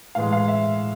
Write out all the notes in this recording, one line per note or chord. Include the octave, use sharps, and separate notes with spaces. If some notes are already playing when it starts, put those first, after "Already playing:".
A2 E3 G#3 F5
F5
E5